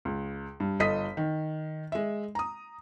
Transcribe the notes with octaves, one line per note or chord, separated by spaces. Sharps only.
C#2
G2
G1 A4 D#5 D#6 B6
D#3
G#3 E5
A#5 D#6